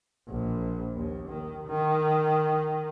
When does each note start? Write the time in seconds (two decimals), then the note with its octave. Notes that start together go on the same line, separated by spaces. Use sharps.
0.28 A#1
0.95 D#2
1.29 D#3
1.67 D#3